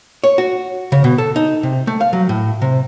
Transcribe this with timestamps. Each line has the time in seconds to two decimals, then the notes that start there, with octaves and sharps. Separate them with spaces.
0.24 C#5
0.38 F#4
0.92 C#3
1.04 B2
1.18 A4
1.36 D#4
1.63 C3
1.87 A3
2.01 F5
2.13 F#3
2.29 A2
2.62 C3